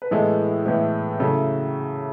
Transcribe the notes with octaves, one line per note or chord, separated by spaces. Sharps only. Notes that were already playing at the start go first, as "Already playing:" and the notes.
B4
A2 E3 G#3 B3 E4 A4
A2 E3 G#3 B3 E4
C#3 F#3 A3 E4 A4